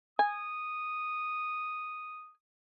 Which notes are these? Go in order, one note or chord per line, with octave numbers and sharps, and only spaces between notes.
G#5 D#6